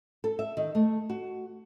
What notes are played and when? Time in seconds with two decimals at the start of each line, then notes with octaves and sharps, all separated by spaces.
0.24 A4
0.39 E5
0.57 D#3
0.75 A3
1.10 F#4